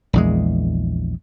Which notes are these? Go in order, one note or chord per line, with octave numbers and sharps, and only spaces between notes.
A#1 E2 G#3